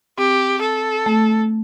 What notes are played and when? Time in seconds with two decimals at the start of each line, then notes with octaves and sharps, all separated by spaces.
0.18 C4 G4
0.61 A4
1.06 A3